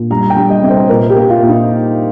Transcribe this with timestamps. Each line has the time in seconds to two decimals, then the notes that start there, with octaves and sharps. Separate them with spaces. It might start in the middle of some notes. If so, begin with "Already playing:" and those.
Already playing: A#2
0.10 G3 A#5
0.21 A#5
0.30 G5
0.37 G3
0.50 D#5
0.63 C3
0.70 C5
0.89 A#2 A#4
1.10 G4
1.16 A#3
1.29 F4
1.42 A#2
1.49 D#4